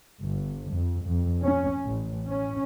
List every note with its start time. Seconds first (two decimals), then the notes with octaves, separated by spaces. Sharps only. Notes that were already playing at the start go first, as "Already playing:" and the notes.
0.23 G1
0.73 F2
1.06 F2
1.44 C#4
1.85 A1
2.29 C#4